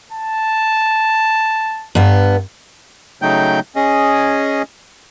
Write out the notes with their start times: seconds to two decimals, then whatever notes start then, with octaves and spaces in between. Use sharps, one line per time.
0.12 A5
1.95 G2 B3
3.22 C#3 F#3 A3 D#4 G5 G6
3.76 C#4 G#4 D#5